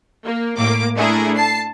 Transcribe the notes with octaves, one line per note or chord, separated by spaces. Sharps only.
A#3
A2 A#3 D6
A3 D4 E4 G#4 A#4
A5 C7